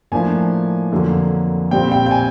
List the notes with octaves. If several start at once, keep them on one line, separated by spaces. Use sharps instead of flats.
A2 F3 A#3 D4 G#5
F2 D3 F#3 A#3
A#2 G3 C4 G5
G5
G5
G#5